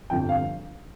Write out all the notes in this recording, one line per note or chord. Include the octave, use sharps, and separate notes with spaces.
G1 F2 F3 G5
F5